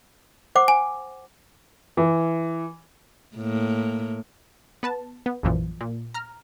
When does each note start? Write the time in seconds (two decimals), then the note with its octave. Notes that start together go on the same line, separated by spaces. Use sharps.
0.55 C5 F#5 D6
0.68 G#5
1.97 E3
3.36 A2 A#3
4.83 B3 B4 A5
5.26 B3
5.43 A#1 F#2 A#2 E3 F3
5.81 A#2
6.14 A#5 F6